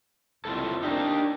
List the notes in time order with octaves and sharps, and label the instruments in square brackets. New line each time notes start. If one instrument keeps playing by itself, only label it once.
[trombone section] C2 F2 [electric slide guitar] C4 E4 A4
[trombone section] D4 [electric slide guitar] D#4 G4 A#4